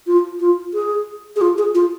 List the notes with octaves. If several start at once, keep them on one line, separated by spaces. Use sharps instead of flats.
F4
F4
G#4
G#4
F4
G#4
F4